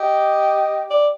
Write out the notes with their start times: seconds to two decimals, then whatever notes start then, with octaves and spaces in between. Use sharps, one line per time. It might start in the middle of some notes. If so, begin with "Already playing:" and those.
Already playing: G4 D#5
0.90 D5